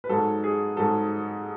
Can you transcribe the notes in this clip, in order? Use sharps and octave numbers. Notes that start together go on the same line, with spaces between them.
B4
G#2 F#3 A4
G#4
G#2 F#3 A4